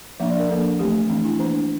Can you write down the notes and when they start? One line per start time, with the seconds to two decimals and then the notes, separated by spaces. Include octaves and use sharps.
0.20 F3 A#3 D4 E5
0.29 D5
0.39 A#4
0.49 F3 A#3 D4 A4
0.79 E3 A3 C4 G4
1.10 E3 A3 C4 D4
1.25 E4
1.39 E3 A#3 D4 C5